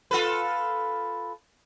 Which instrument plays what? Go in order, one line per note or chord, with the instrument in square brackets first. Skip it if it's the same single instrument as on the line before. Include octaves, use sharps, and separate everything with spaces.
[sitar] F4 A4 B4